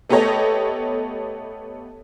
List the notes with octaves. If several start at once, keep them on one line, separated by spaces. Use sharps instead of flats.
A3 B3 G4 A4 C#5 D#5